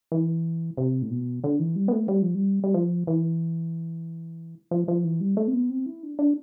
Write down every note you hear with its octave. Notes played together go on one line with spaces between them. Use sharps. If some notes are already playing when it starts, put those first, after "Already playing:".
E3
C3
A2
B2
D3
E3
G3
B3
A3
G3
F3
G3
G3
F3
E3
F3
F3
E3
G3
A3
C4
B3
C4
E4
D4
D4